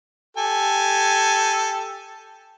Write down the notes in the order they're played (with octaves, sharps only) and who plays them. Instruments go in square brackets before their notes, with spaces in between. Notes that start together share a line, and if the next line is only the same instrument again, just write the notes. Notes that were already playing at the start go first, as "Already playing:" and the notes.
[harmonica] G4 A4 G#5